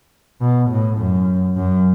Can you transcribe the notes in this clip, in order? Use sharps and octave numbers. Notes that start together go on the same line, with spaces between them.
B2
A2
F#2
F#2